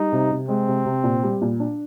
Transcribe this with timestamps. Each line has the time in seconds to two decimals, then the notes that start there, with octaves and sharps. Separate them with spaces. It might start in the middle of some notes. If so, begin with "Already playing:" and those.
Already playing: G3 D#4
0.12 C3
0.31 C3
0.49 G#3 C4
0.68 C3
0.85 C3
1.04 A#2
1.23 G3
1.41 A#2
1.60 D4